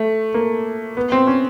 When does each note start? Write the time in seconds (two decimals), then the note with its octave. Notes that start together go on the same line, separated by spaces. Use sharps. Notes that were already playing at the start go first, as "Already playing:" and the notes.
Already playing: A3
0.34 A#3
0.97 B3
1.12 C4
1.27 C#4